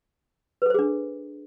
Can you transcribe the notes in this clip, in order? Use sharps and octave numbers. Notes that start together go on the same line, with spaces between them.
D4 G#4 A4 B4 C5